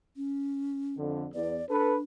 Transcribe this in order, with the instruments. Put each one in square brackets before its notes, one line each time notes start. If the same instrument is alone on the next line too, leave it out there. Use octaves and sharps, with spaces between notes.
[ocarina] C#4
[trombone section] F2 D3
[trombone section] E2 [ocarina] D5
[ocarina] D4 [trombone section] A4 B4